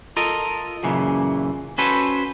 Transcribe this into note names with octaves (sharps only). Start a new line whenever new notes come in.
F4 A4 A#4 D#5
F#2 A#2 C#3 E3
C#4 F#4 A4 B4 C5